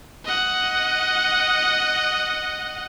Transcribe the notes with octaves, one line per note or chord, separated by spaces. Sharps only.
D#5 F#5